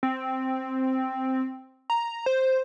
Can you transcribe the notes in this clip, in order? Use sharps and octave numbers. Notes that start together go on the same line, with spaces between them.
C4
A#5
C5